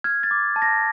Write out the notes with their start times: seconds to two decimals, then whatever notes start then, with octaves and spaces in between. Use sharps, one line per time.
0.04 F6 G#6
0.23 A6
0.31 D6
0.56 A5
0.62 A#6